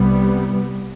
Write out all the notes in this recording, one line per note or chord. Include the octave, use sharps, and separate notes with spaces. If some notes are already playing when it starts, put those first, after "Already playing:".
Already playing: C2 C3 G3 B3